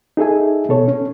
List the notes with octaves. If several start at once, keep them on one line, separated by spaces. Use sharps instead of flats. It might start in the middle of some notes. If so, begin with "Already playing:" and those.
D#4 G#4 A4 E5 G#5
B2 A4 C#5
C#4